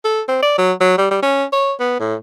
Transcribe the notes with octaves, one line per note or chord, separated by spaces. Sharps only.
A4
C4
D5
F#3
F#3
G3
G3
C#4
C#5
B3
A2